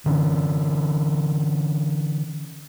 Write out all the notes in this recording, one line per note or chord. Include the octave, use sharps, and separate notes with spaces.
D3 E3 C#4